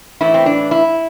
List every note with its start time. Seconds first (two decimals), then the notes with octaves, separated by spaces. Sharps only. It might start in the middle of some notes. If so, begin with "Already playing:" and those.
0.21 A2 E3 E4
0.34 C4
0.46 D4
0.71 E4